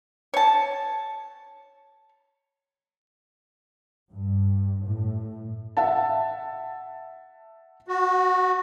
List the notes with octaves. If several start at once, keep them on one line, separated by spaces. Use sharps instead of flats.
C#5 A5
G2
A2
E5 F#5 A5
F#4